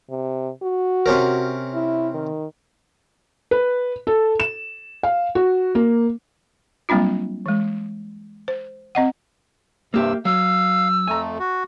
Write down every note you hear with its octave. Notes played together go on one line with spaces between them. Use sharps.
C3
F#4
C3 C#4 A#4
E4
D#3
B4
A4
E7
F5
F#4
A#3
F#3 G3 A#3 C4 D4 F4
E3 G#3
C5
C4 D#5 F#5
G2 C3 A#3 G4 E5 E6
F#3 F5 E6
F2 A3 G#5 A#5
F#4